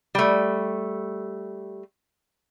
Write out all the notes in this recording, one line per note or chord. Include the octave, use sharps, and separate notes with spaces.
G3 A3